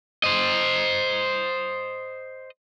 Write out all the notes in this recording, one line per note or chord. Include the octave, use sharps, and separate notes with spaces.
C5 D#5